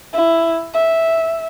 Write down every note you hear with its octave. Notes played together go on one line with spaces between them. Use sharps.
E4
E5